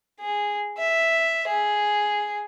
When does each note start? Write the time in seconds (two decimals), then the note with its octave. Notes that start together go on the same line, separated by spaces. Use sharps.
0.20 G#4
0.78 E5
1.47 G#4